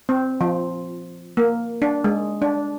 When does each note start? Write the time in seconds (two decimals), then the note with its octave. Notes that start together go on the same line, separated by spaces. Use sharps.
0.09 C4
0.41 F3
1.37 A#3
1.82 D4
2.04 G#3
2.42 D4